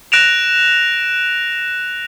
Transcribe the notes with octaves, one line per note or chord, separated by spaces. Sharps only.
F#6 A#6 D7 E7 F7